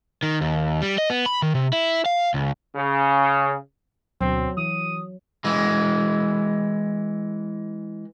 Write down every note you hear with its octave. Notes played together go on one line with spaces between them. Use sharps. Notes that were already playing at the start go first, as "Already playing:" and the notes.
D#3
D#2
G3
D#5
B3
B5
D#3
C3
E4
F5
C#2
C#3
D2 B2 F#3 C4
E3 D#6
E3 G#3